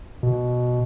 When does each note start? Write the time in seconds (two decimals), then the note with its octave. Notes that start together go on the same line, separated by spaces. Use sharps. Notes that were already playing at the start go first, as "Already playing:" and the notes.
0.23 B2